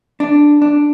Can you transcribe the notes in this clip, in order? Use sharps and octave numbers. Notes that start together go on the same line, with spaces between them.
D4
D4